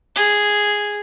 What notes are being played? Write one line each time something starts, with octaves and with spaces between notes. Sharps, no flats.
G#4